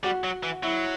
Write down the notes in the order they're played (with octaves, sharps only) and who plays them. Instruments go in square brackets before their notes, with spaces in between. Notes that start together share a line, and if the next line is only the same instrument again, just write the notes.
[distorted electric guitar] G3 [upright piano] F#4
[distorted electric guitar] F#3
E3
[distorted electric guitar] F#3 [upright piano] E4